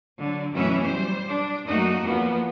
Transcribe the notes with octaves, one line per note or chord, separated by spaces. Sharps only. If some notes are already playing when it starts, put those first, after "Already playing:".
D3 F#3
F#2 B2 E3 A3 C#4 E5
G3 C5
D4
F#2 A3 A#3 D#4 F#4
E2 F3 A#3 B3